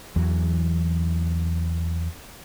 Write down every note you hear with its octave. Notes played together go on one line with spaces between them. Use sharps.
E2 E3 F#3